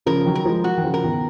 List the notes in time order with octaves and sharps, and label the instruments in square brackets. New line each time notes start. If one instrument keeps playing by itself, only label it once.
[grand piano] C#3 F3 [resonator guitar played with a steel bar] A#4
[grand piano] D#3 F#3
[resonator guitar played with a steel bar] A#4
[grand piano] F3 G#3
[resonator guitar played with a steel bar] F#4
[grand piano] D#3
C#3 F3
[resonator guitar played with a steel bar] A#4
[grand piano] B2 D#3